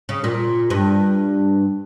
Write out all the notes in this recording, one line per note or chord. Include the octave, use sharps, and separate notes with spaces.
C#3
A#2
G2